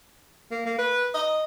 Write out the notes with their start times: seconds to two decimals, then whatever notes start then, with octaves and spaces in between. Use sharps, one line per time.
0.51 A#3
0.66 A#3
0.78 B4
1.14 D#5